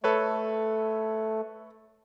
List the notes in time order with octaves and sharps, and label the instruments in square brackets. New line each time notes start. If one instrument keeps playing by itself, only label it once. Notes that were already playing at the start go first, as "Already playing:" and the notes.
[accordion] A3 [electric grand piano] A4 B4 C#5